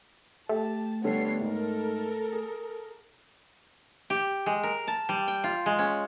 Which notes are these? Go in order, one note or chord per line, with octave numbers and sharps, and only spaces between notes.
A3 G4 A5
D3 G3 B3 A4 C#5 C7
G#2 A4 A#4
G#4
G4
G#3
A#4
A5
G3
G5
F4
G#3
C#4